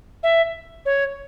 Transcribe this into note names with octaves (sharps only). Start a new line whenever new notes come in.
E5
C#5